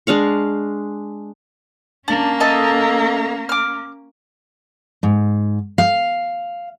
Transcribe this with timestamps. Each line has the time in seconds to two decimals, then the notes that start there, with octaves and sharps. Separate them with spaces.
0.07 G#3 D4 F5 C#6
2.08 A#3 C#4 D4
2.40 A4 D#5 E5
3.49 D6 F6
5.03 G#2
5.78 F5